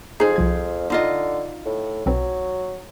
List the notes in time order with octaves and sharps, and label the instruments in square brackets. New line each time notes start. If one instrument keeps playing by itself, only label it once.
[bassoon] F2 [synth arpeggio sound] D#4 [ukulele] G#4 C5
[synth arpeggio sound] C2 F3 G#6
[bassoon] D3 [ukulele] D#4 F4 D#5
[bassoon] A2
[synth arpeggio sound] B1 C4 B4 [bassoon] F#3